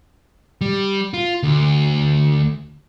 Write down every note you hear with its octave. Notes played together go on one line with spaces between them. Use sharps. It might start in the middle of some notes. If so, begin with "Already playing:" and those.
G3
F4
D2